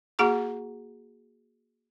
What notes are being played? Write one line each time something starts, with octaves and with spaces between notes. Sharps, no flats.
A#3 F#4 G#4 A#5 C#6